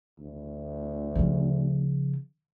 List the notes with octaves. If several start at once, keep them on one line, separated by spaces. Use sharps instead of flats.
D2
C#3 F3